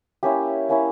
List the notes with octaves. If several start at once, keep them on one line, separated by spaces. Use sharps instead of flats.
A#3 C#4 E4 G4
A#3 C#4 E4